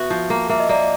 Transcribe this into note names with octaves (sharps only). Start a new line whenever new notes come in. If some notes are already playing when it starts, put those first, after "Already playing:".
Already playing: B3 F#4 E5
F3
A#3
A#3 E5
D#5
A#3 D5
D#5